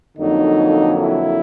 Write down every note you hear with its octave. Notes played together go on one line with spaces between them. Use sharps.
F2 D3 F#3 A#3 D#4
E4